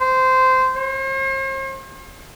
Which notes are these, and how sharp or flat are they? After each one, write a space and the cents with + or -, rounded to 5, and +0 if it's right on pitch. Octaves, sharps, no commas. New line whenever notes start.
C5 -15
C5 +45